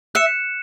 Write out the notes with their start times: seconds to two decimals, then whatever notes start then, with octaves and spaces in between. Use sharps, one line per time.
0.15 E5 F#6 C#7 E7